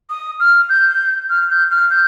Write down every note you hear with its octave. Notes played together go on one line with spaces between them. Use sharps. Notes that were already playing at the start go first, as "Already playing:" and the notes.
D#6
F6
G6
F6
G6
F6
G6